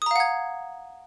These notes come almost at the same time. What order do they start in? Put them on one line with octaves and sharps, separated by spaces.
D#6 A#5 F5 F#5 G#6